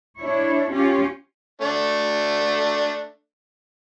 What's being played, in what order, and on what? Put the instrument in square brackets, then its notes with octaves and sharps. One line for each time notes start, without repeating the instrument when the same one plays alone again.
[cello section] D4 E4 C#5
C#4 F4 G4
[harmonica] A3 D4